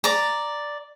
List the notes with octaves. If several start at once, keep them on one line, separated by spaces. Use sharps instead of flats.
D5 A#5